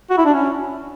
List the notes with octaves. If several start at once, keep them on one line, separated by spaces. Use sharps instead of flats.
F#4
E4
D4
C#4